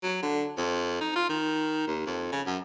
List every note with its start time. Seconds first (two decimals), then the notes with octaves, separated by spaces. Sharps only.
0.03 F#3
0.22 D3
0.57 F2
1.00 D#4
1.15 F4
1.29 D#3
1.87 D#2
2.06 F2
2.32 C#3
2.46 F#2